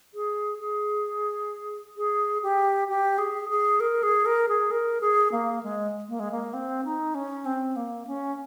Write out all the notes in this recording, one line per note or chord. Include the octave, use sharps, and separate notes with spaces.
G#4
G#4
G#4
G4
G4
G#4
G#4
A#4
G#4
A#4
G#4
A#4
G#4
A#3
G#3
A#3
G#3
A#3
C4
D#4
C#4
C4
A#3
C#4